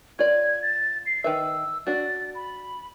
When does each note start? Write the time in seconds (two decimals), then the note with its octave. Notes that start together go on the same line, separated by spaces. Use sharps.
0.19 F4 D5 G#6
0.62 A6
1.06 C7
1.24 D#3 B4 E5 E6
1.87 D4 F#4 A6
2.35 B5